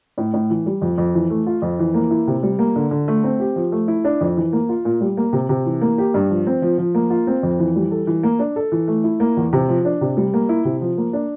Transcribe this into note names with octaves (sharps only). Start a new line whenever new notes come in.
A2
A2
E3
G3
F2
F2
E3
A3
F4
F2
E3
A#3
E4
C3
G3
A#3
D3
D3
A3
C4
G4
F3
A3
E4
D4
F2
E3
A#3
F4
A#2
G3
A#3
C3
C3
E3
A#3
G4
G2
F3
C4
F3
F3
A#3
F4
C4
F2
E3
G3
A4
E3
A#3
D4
A4
E3
A3
E4
A#3
E2
C3
F3
D4
C3
G3
A#3
E4
C3
F3
A#3
D4